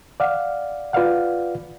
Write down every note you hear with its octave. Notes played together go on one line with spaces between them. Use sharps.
D5 F5 F#5
F4 B4 D5 F5 F#5